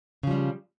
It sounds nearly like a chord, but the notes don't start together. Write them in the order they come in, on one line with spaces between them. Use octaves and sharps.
C#3 F3 G3